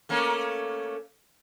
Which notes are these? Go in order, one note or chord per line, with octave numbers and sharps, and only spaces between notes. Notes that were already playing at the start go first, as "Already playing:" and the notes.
A3 A#3 C#4